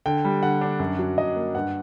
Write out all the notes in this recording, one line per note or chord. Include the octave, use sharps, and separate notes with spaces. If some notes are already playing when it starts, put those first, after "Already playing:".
D3 G5
G3
D3 F#5
D4
F#2
F#3
F#2 D#5
A#3
G2 F#5